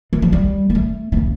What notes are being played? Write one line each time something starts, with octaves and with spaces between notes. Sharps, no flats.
E3
F3
G3
A#3
A3
D3
C#3